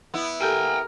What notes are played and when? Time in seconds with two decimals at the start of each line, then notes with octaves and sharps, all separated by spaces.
0.14 B3 E4
0.41 G4 A4 A#4 G5 G#5